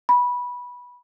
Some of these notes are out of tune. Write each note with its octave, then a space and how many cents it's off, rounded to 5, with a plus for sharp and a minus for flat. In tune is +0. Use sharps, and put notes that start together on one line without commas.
B5 -15